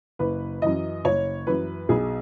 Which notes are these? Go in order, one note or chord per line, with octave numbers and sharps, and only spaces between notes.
F#1 B4
F#2 E3 D#5
F#1 C#5
F#2 E3 B4
B1 G#4